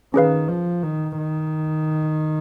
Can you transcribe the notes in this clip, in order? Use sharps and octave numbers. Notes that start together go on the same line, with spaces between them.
D#3 C#4 G#4 B4 F5
F3
D#3
D#3